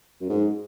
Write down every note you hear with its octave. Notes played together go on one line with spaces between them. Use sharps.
F#2
G#2